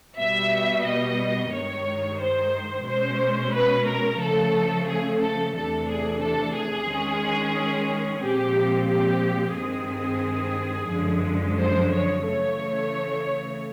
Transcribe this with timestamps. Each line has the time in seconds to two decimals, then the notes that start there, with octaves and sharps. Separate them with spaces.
0.17 B2 G3 B3 E5
0.85 D#5
1.52 G2 D#3 G#3 C#5
2.19 C5
2.86 B2 G#3 C#4 C5
3.53 B4
3.86 A#4
4.20 C#3 F3 A3 A4
4.86 G#4
5.21 A4
5.54 E2 C3 E3 A3 D4 A4
5.88 G#4
6.21 A4
6.55 G#4
6.89 D#3 G#3 C#4
8.22 A#2 F3 G#3 C4 G4
8.89 G4
9.56 G2 D#3 G#3 C4 G#4
10.91 F#2 D3 F3 G#3
11.58 C5
11.92 C#5
12.25 C#3 E3 A3 C#5